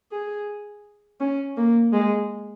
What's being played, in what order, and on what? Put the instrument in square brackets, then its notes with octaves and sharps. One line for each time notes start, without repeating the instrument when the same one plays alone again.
[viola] G#4
C#4
A#3
G#3